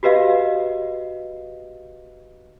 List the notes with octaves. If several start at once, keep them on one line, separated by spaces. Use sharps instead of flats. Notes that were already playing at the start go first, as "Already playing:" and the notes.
F#4 G4 B4 D#5 F5